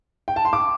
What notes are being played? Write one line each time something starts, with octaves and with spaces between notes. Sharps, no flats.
G5
A5
C6
D6